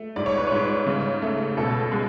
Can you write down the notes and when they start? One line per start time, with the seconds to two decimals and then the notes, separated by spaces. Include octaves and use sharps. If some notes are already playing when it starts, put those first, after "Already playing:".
Already playing: A3
0.16 G#2 D5
0.26 C#5
0.37 B4
0.47 G#2 C#5
0.86 C#3
1.22 A3
1.57 B2 A4
1.92 G#3